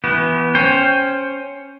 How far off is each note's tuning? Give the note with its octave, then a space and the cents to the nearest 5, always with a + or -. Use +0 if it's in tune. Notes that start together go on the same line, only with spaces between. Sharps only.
E3 +0 B3 -10 G4 -45
C#4 +0 C5 +15 G5 +10